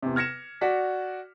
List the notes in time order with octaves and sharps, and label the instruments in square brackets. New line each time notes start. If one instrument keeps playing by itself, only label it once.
[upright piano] E2 C3
F6 G#6 A#6 C#7 E7
F#4 D5 B6